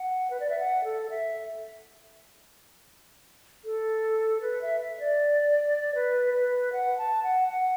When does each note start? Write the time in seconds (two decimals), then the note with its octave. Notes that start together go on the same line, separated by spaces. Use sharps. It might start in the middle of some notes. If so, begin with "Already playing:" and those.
Already playing: F#5
0.30 B4
0.40 D5
0.50 E5
0.59 F#5
0.84 A4
1.10 E5
3.65 A4
4.41 B4
4.62 E5
4.80 E5
5.00 D5
5.95 B4
6.34 B4
6.73 F#5
6.98 A5
7.23 F#5
7.48 F#5